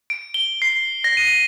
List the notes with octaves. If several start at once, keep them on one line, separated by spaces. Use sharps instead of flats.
D7
G7
C7
A#6
D#7